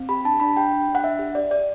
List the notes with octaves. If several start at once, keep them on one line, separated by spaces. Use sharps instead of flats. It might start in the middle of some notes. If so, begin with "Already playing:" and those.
Already playing: C4
G4 B5
D4 A5
D4 B5
G4 G5
D4
D4
F#5
D4 E5
G4
G4 D5
G4 D5